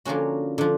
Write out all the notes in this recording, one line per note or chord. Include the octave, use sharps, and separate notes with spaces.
D3 F3 A#3 C#4 F#4
D3 F3